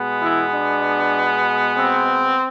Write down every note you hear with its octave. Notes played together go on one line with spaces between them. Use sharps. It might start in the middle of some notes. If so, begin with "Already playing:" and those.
Already playing: B2 G#3 B3
E3 E4
D4
C4